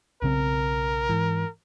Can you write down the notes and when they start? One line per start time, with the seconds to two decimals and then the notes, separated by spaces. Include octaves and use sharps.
0.22 B1 C#3 C4 A#4
1.09 G#2 E3